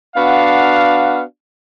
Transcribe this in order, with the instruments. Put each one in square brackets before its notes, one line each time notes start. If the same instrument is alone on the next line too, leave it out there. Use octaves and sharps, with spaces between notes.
[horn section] B3 D4 F#4 F5